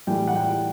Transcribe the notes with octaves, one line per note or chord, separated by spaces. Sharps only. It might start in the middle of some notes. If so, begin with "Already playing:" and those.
A2 E3 G3 G5
F#5
G5